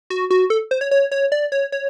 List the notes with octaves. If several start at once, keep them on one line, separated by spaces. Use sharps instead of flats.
F#4
F#4
A4
C5
C#5
C#5
C#5
D5
C#5
C#5